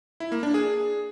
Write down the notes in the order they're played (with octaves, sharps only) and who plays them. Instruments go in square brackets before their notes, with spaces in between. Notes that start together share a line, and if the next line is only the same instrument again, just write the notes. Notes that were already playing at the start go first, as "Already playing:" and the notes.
[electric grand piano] E4
A#3
D4
G#4